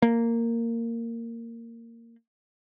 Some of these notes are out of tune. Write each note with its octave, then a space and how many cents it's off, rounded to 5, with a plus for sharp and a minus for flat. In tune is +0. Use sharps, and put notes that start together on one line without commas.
A#3 -15